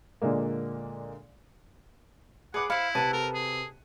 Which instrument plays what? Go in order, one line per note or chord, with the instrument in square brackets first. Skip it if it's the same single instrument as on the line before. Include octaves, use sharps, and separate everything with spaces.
[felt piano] A#2 D3 G#3 A#3
[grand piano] G#4 D6 F#6 [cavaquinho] B4 [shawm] F#5
[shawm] E4 [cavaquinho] C5 F5 [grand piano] B5 C#7
[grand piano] C3 B4 D#7 [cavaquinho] F#5 A5
[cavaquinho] A4 [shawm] A#4
[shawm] G#4